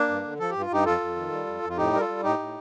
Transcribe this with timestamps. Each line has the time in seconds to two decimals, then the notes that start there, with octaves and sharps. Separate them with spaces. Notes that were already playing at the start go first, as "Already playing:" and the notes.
Already playing: A#3 D4
0.09 G2
0.24 D3
0.39 F3 A4
0.50 G2 G4
0.61 F4
0.70 G2 D#4 G4
0.85 F2 F4 A4
1.01 F2
1.16 D#3
1.31 G3
1.47 F2
1.62 F2
1.70 F4
1.77 A2 D#4 G4
1.93 G3 A#4
2.00 F4 A4
2.08 G3
2.23 A2 D#4 G4
2.39 A2